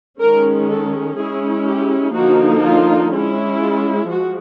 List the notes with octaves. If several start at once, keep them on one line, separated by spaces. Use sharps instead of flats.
D#3 G#3 C#4 A#4
A4
G#3 C#4 E4 G#4
G4
D3 F3 A#3 D#4 F#4
F4
G#3 C#4 E4
F4
F3 G#3 F#4